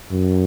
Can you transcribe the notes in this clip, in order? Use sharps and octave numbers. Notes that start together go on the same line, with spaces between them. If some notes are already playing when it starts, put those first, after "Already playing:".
F#2